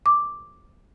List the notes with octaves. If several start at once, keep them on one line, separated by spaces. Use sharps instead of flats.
D6